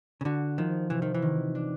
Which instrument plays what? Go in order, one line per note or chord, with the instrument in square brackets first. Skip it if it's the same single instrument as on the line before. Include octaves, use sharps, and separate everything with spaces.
[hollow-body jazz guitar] C#3
[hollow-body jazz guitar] D3 [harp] F#4
[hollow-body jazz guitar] D#3 [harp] F3
[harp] C3 [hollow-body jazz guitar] E3
[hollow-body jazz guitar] D#3
E3
[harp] D#3
D4